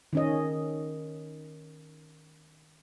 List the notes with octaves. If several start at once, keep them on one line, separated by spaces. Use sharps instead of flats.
D#3 C#4 D#5